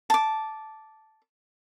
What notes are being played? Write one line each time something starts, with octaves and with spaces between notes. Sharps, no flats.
A5 D6